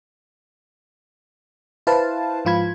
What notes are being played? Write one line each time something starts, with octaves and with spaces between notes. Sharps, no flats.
E4 B4 C5 F5 A5
G#2 F3 F4 B5 G#6